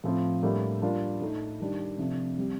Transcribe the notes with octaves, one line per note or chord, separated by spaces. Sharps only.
A2 F3 C4 F4
A2 G3 A#3 D4 G4
G3 A#3 D4 F4
A2 A3 D#4
D#3 G3 D4 G4
C3 F3 A3 D4
G3 C4 G4